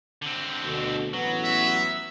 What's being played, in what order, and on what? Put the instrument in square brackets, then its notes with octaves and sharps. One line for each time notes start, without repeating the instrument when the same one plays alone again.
[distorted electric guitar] D3 C4
[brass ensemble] D2 B2
[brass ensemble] A1 B3 [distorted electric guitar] F#3
[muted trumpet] E5